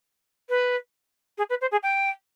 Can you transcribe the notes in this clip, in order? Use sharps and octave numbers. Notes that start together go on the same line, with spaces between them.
B4
G#4
B4
C5
G#4
G5